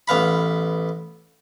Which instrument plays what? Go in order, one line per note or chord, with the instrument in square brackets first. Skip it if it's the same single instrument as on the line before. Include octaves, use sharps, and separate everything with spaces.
[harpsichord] A1 B3 F5 B5